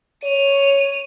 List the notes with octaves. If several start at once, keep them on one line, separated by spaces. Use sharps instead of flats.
C#5 D#7 F7